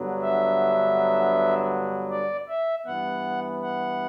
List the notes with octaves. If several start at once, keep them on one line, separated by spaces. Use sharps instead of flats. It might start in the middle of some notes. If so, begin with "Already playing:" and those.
Already playing: G2 D3 F#3 B3
E5
D5
E5
G2 E3 B3 F#5
F#5